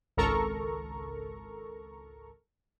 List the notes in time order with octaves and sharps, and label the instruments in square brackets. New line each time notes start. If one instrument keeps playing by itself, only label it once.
[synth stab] G#1 C#2 A4 A#4 A#5 C#6